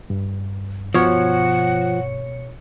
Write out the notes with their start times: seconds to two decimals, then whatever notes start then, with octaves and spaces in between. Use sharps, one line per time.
0.10 G2
0.94 B2 F3 C#5 F#5 C#7